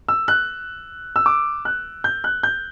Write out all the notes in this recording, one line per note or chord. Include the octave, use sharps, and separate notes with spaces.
E6
F#6
E6
D6
F#6
G6
F#6
G6